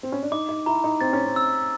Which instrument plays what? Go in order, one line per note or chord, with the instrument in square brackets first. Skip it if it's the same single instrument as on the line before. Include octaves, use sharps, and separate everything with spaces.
[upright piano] C4
C#4
D4
[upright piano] D#4 [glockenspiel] D6
[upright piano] D#4
[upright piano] E4 [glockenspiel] A#5
[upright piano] D#4
[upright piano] C4 [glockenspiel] A6
[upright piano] C#4
C4
[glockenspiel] E6